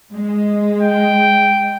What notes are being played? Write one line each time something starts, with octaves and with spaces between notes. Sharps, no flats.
G#3
G5